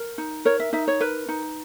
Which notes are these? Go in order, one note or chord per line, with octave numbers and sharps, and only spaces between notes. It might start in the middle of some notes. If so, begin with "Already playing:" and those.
Already playing: A#4
D#4
A#4 C#5
E5
D#4 E5
C#5
A#4 B4
D#4